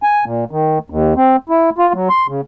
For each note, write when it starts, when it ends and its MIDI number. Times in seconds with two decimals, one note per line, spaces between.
0.03 0.25 80
0.25 0.45 46
0.51 0.79 51
0.90 1.14 39
1.16 1.36 60
1.49 1.70 64
1.78 1.93 65
1.94 2.08 54
2.09 2.27 84
2.28 2.41 49